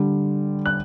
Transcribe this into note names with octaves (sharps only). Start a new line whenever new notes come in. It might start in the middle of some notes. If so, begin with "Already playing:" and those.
Already playing: D3 G3
F#6